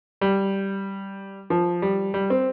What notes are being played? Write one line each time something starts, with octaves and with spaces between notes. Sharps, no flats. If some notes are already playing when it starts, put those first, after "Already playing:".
G3
F3
G3
G3
C4